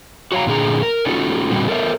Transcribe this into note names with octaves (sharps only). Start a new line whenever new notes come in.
F#4 C#5 F5 A#5
A#2 D3 G#4 A#5
A#4
C#4 D#4 F4 F#4 A4
A#2 D3 G3 C4 F#4
A4 A#4 C#5 D#5 E5